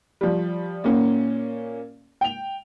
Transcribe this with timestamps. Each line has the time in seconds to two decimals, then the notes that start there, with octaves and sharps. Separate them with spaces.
0.21 F3 G3
0.84 A#2 A#3 C#4
2.21 G5 F7